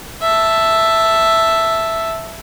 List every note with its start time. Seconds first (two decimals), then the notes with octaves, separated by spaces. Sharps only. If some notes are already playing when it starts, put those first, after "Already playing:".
0.21 E5 A5